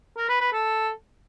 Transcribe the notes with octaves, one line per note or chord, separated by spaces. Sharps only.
A#4
B4
B4
A4